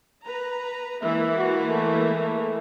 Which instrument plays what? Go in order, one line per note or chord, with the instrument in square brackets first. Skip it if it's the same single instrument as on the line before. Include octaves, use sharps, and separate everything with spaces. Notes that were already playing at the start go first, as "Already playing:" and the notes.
[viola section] B4 A#5
[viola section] E3 G#3 A#3 [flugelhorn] E5
[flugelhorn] F#4
A3
A3